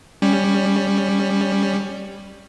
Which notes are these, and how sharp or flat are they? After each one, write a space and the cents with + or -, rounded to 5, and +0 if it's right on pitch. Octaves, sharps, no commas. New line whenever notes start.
G3 +10 C#4 +0